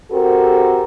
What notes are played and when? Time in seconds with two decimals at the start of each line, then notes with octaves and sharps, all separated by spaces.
0.11 C4 F#4 G4 A4 A#4